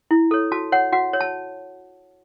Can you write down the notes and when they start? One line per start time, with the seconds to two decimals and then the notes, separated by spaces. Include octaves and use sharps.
0.11 E4
0.31 A4 C#5
0.52 F#4 A5
0.72 C#5 F#5
0.92 F#4 F#5
1.14 C#5
1.21 A5